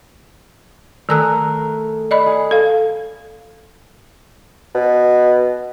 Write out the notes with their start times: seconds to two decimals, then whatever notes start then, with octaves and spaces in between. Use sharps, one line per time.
1.09 D#3 A3 G#4 A#4 E6 F#6
2.11 D5 D#5 B5
2.26 G#4
2.51 A4 F5
4.75 B2